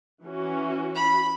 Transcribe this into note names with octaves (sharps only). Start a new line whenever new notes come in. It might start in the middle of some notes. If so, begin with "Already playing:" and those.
E3 C#4 F#4
B5